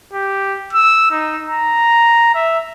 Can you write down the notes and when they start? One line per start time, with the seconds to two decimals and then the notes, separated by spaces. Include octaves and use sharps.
0.13 G4
0.73 E6
1.11 D#4
1.49 A#5
2.35 E5